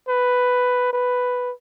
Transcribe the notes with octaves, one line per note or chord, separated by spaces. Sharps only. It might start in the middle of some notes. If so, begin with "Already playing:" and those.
B4
B4